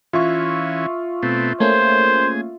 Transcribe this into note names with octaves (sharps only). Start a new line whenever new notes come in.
E3 C#4 F4 E5 C#6
B2 A3 C4
A3 A#3 C#4 G#4 C5